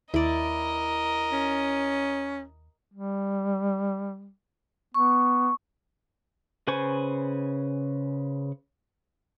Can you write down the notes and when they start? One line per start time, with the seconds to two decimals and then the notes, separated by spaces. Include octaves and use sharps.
0.14 D#2 E4 A#4 D5 D#5
1.32 C#4
2.93 G3
4.94 B3 C#6
6.67 C#3 B4 C5 G#5 C#6